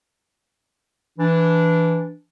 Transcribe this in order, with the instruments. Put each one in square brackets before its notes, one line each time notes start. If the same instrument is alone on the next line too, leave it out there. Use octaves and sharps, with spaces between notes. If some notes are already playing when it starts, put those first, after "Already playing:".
[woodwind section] E3 D4